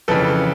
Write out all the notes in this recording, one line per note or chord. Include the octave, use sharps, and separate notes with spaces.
F2 C#3 E3 A4 B4